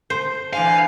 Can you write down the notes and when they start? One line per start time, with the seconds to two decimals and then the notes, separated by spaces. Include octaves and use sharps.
0.10 C5
0.53 D3 E3 F5 G#5